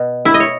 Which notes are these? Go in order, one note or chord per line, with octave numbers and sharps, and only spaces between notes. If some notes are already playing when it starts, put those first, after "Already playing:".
Already playing: B2
E4
D#5
C#5